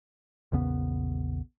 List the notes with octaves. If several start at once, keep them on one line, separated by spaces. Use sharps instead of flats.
A#1 E2 C#3 B3